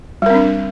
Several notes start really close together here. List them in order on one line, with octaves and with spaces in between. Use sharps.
G3 A#4 C4 D4